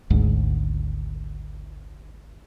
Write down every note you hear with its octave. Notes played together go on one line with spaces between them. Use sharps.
G#1 D2 G#2